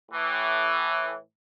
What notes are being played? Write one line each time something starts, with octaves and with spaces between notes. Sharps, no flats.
A2 E3